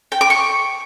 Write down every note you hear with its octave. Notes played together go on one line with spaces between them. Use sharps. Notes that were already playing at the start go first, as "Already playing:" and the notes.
G5
D6
C#6